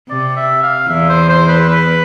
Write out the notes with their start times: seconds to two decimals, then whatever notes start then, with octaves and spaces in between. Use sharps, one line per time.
0.10 C3 D5
0.37 E5
0.63 F5
0.89 E2 E3 E5
1.09 C5
1.29 C5
1.48 B4
1.69 B4